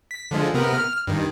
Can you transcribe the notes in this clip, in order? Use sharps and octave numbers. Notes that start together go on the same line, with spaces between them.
B6
D3 F3 G#3
C3 B3 A#4
F6
G2 D#3